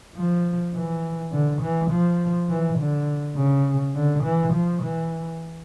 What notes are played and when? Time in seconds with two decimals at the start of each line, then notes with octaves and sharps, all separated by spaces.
0.15 F3
0.74 E3
1.32 D3
1.61 E3
1.90 F3
2.49 E3
2.78 D3
3.36 C#3
3.95 D3
4.23 E3
4.53 F3
4.82 E3